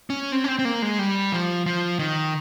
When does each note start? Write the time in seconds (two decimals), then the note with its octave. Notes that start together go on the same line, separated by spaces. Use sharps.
0.10 C#4
0.32 C4
0.44 C#4
0.48 C4
0.59 C4
0.65 A#3
0.82 G#3
0.99 G3
1.32 F3
1.66 F3
1.99 D#3